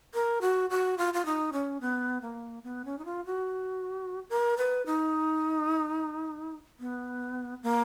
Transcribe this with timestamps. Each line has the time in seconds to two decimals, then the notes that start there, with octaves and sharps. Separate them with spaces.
0.14 A#4
0.41 F#4
0.70 F#4
0.98 F4
1.14 F4
1.25 D#4
1.53 C#4
1.81 B3
2.22 A#3
2.64 B3
2.85 C#4
2.98 D#4
3.05 F4
3.26 F#4
4.30 A#4
4.57 B4
4.86 D#4
6.80 B3
7.63 A#3